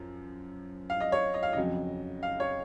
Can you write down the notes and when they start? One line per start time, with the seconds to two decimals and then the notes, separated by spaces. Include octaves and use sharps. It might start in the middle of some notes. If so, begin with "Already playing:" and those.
Already playing: F#2 F3
0.90 F5
1.00 D#5
1.12 C#5
1.34 D#5
1.43 F5
1.53 F2 C#3 F#3 D#5
2.23 F5
2.40 C#5